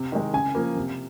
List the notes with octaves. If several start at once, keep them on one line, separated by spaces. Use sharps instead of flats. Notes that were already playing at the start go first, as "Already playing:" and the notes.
Already playing: C3
D#3 G#3
C#3 G#5
F3 A#3
C3